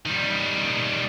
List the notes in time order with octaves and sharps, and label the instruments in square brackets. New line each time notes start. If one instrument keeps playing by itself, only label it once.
[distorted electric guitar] D#3 G3